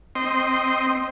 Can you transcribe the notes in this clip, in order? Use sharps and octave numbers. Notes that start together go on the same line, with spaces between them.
C4 D#5 C6